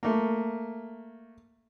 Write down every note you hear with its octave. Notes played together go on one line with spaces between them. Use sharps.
A3 A#3